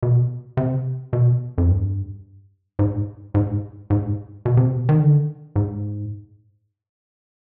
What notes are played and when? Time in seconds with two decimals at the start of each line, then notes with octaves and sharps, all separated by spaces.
0.03 B2
0.57 C3
1.13 B2
1.58 F2
1.69 G2
2.79 G#2
3.34 G#2
3.90 G#2
4.45 B2
4.57 C3
4.69 B2
4.89 D#3
5.00 D3
5.56 G#2